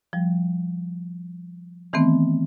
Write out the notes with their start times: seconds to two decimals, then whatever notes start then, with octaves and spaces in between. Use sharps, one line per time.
0.13 F3 G3
1.93 D#3 E3 A3 B3 C4